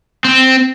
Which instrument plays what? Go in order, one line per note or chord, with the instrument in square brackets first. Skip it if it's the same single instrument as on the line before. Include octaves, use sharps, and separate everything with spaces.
[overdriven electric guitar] C4